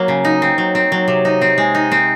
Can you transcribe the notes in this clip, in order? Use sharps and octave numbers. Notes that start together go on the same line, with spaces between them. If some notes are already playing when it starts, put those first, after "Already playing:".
Already playing: F#3 A#3
C#3
D#4
C4
F#3
C4
F#3
C3
D#4
C4
G#3
D#4
C4